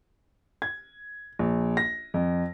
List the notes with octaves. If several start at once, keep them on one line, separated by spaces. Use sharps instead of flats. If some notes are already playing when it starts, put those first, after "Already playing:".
G#6
A#1
A#6
F2